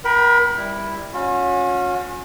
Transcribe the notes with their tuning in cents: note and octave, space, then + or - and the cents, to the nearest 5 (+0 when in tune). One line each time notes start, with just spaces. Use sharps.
A#4 +35 G5 -30 B5 +0
G3 +15 E4 +0
C#4 +0 F#4 -45